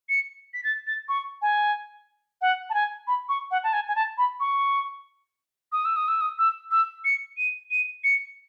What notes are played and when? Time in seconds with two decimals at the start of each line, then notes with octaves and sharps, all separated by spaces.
0.09 C#7
0.54 B6
0.64 A6
0.87 A6
1.08 C#6
1.42 G#5
2.41 F#5
2.69 A5
2.74 G#5
3.07 B5
3.29 C#6
3.51 F#5
3.63 A5
3.73 G#5
3.88 G#5
3.95 A5
4.18 B5
4.40 C#6
5.72 D#6
5.85 E6
5.96 D#6
6.08 E6
6.21 D#6
6.38 E6
6.71 E6
7.04 C#7
7.37 D#7
7.71 D#7
8.04 C#7